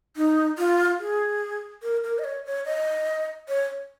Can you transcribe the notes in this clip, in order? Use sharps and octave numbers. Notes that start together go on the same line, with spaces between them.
D#4
F4
G#4
A#4
A#4
D#5
C#5
C#5
D#5
C#5